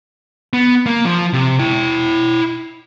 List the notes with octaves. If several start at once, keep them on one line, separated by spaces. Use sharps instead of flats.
B3
A#3
F3
C3
E4 G5